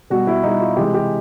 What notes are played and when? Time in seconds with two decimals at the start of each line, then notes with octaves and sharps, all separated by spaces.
0.10 B2 G3 F#4
0.27 E4
0.43 B2 G3 D#4
0.61 F4
0.77 C3 E3 G#3 G4
0.94 G4